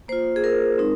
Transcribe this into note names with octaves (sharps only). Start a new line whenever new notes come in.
A#3 F4 C5
G#4
A#4
G#3 C4 D#4